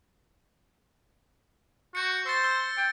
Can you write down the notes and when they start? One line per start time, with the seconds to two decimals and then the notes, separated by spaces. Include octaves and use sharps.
1.95 F#4 G6 C#7
2.26 C5 E6 A6
2.44 E6
2.77 G5